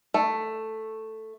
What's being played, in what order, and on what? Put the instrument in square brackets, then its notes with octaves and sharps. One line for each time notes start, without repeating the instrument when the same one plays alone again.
[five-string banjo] A3